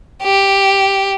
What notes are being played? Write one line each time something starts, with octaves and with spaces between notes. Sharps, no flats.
G4